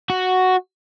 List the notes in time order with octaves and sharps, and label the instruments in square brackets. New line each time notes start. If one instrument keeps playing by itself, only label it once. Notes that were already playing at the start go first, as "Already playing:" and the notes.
[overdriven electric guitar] F#4